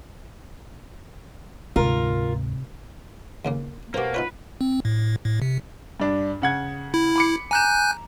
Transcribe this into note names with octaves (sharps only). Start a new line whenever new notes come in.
D2 G#2 C3 F4 A#4
D#2 C#3 A#3
B2 A#3 G4 A#4 C5
D#4 F4 B4 C#5
C4
A2
A2
C3
G2 D4
C#3 F#5 G#6
E4
B5 D6 C#7
G#5 A#5 F#6 G6 E7